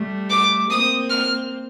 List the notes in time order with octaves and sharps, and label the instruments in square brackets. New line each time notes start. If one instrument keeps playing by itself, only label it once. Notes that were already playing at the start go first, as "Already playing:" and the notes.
Already playing: [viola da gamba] G3 A3
[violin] D6
[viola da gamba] A#3 C4 [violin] D#6
[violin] F6